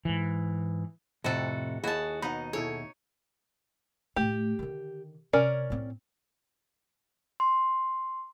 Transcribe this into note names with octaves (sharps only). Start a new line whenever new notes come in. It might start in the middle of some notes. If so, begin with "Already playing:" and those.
G#2 E3
F2 A2 C3 F#4 A4
D#2 E4 F#4 G#4 A5
B2 D#4 F#5 A#5 B5
B2 E4 G#4 A4 C#5
A2 A3 G4
D3 D#3
C3 C#4 A#4 D5
A2 C4
C6